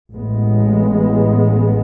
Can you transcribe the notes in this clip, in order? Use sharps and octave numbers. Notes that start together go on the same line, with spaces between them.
A1 A2 G#3 B3